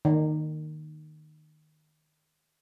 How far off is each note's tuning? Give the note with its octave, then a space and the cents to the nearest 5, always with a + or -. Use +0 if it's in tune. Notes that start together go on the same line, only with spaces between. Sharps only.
D#3 -15